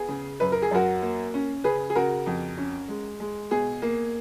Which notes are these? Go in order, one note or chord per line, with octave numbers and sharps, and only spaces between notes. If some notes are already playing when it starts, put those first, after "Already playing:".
Already playing: B3 G#4
C#3
F#2 B4
A#4
G#4
F#2 F#4 A#4
A#3
C#4
C#3 G#4 B4
G#4
C#3 F#4 A#4
F2
C#4
G#3
G#3
B2 G#4
A#3